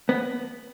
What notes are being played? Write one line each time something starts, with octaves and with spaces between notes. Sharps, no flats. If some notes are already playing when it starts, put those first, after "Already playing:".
B3